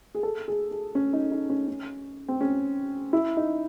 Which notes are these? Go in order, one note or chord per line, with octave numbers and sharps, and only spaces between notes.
G#4
A4
G#4
G#4
C#4
D#4
D#4
C#4
C#4
C4
C#4
E4
D#4